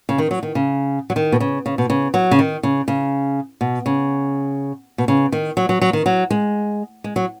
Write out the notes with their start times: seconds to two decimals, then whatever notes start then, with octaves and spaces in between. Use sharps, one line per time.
0.09 C#3
0.18 D#3
0.31 F#3
0.43 D#3
0.55 C#3
1.10 F#3
1.16 D#3
1.32 B2
1.40 C#3
1.66 C#3
1.78 B2
1.90 C#3
2.14 F#3
2.31 C#3
2.39 D#3
2.63 C#3
2.88 C#3
3.61 B2
3.86 C#3
4.98 B2
5.08 C#3
5.32 D#3
5.57 F#3
5.69 F#3
5.82 F#3
5.93 D#3
6.06 F#3
6.31 G#3
7.04 G#3
7.16 F#3